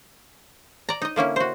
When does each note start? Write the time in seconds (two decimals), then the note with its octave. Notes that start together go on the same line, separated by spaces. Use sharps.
0.89 D5 A#5
1.02 D#4 D#5
1.16 D3 A#3 C#4 E4
1.36 F#4 C5